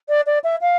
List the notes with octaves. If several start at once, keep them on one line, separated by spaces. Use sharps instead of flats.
D5
D5
E5
F5